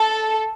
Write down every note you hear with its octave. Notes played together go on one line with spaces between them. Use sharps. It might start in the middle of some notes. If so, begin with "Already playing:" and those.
Already playing: A4